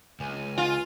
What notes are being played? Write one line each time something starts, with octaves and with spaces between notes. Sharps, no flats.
C#2 G#5
F4